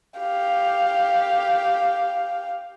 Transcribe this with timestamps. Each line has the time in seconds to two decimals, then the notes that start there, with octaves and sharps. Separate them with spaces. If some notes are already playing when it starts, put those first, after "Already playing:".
0.18 G4 F5